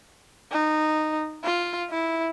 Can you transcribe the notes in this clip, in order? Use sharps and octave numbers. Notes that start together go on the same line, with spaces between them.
D#4
F4
E4